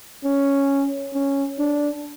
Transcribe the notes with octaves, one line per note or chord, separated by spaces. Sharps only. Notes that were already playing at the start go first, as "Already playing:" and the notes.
C#4
C#4
D4